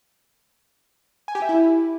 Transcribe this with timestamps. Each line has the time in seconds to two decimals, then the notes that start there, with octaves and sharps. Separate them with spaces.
1.28 G#5
1.35 G4
1.42 E5
1.49 E4